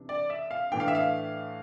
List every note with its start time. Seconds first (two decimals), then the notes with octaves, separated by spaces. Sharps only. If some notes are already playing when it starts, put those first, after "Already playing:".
Already playing: C3 E3 D4
0.09 D5
0.30 E5
0.51 F5
0.72 A2 E3 A3 D4 G5
0.80 F5
0.88 E5
0.95 F5